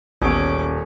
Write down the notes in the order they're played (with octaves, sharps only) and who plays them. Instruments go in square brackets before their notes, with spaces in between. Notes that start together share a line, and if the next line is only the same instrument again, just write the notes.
[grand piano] D#1 [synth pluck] A1 B3 [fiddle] C#4 D6 [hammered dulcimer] G#4 A4 C#5